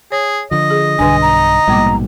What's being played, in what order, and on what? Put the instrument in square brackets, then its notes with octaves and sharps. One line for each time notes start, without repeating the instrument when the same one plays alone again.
[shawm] G#4 [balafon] C#5
[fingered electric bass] D3 F3 [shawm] D#5
[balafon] G#4
[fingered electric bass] B1 G2 [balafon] D3 D4 [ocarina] G#5
[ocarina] A#5
[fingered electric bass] A#1 G#2 B2 [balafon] G3 A#3 D6